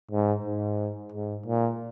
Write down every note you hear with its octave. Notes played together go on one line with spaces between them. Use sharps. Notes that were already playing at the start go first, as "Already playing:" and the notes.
G#2
G#2
G#2
A#2